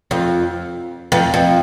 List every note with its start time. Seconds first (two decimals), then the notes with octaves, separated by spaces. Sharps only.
0.11 F2
1.12 F2
1.34 F2